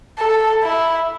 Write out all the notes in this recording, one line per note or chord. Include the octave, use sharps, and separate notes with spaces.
A4
E4